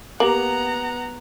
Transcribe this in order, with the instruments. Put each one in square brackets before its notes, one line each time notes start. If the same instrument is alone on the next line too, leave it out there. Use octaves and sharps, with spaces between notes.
[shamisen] A#3 [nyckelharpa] B3 [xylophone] G4 F#7 [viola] F#5 A#5